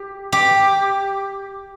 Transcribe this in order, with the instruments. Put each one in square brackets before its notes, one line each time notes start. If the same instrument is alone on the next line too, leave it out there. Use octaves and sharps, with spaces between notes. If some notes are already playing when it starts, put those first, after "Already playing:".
Already playing: [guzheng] G4
G4